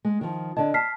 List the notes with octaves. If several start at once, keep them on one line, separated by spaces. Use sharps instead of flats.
G#3
D#3 F3
D3 D5 D#5 A5
A5 F6 B6 C7